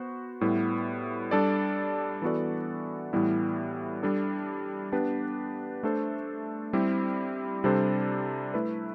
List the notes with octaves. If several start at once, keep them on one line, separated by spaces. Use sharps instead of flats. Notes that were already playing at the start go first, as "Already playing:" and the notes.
Already playing: B3 F#4 C5
A2 G3 B3 E4 B4
G3 D4 A4 D5
E3 B3 F#4 A4 D5
A2 E3 G3 B3 E4
G3 D4 A4
B3 D4 G4 B4
A3 D4 A4 C5
G3 C4 E4 G4
C3 G3 D4 A4 C5
A3 E4 B4